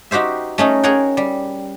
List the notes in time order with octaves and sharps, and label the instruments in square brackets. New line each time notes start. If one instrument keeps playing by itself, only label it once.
[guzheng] D#4 F#4 G4 C5 E5
A3 C#4 D#4 A#4
G#4 A#4 C#5 F#5 G5
G3